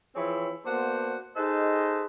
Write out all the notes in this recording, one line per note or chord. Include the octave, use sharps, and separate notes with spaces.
E3 F3 C4 E4 G#4 C#5
A#3 B3 D4 F#4 C5
D#4 G#4 A4 B4 C5 D#5